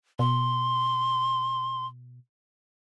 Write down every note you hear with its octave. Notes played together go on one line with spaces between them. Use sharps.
B2 C6